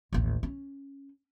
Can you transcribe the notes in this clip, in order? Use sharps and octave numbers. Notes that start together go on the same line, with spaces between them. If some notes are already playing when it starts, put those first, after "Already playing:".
A1 D#2
C#4